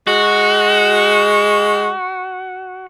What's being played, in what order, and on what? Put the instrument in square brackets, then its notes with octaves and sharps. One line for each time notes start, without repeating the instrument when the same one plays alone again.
[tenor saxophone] G#3 [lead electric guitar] F#4